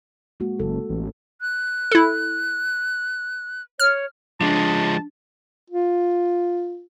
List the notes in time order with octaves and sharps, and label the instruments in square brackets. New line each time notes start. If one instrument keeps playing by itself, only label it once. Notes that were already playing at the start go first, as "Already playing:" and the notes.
[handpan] G#3 A#3 F#4
[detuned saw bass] F#1 [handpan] A4
[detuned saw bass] A1
[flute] F#6
[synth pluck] E4 A4
[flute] C#5 [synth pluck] F6
[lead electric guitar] F3 G#3 [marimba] D4 [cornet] A5
[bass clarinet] F4